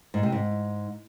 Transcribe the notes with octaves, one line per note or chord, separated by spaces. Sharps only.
G#2
C3
G#2